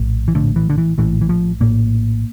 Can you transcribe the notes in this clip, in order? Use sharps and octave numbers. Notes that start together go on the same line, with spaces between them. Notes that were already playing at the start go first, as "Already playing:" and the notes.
Already playing: A#1 A2
E3
A#1 A2 D3
E3
D3
E3
A#1 A2 E3
E3
F3
A#1 A2 A#3